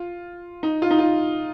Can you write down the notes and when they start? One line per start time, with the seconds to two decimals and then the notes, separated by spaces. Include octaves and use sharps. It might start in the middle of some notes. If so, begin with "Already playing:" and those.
Already playing: F4
0.63 D#4
0.82 F4
0.91 D#4
0.99 F4